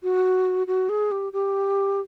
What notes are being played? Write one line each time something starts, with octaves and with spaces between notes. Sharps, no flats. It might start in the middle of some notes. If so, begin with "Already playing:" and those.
F#4
F#4
G#4
G4
G4